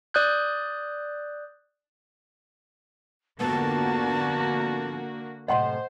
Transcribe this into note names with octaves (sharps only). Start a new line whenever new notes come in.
D5 D#6 F#6 G6
F2 G#2 D3 A#3 B3 F#4 A5
F#2 A2 C3 C5 D#5 F#5 C6